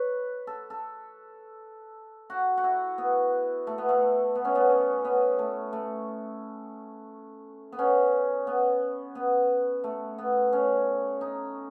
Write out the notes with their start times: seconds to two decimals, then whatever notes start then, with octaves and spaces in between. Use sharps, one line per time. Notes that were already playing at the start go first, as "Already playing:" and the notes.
Already playing: B4 C#5
0.47 A4
0.70 A4
2.30 F#4
2.57 F#4
2.64 E4
2.98 B3
3.67 A3
3.78 B3
3.89 A3
4.35 B3
4.45 C#4
4.55 B3
4.69 C#4
5.05 B3
5.39 A3
5.73 A3
7.72 B3
7.79 C#4
8.47 B3
9.15 B3
9.84 A3
10.18 B3
10.53 C#4
11.21 D#4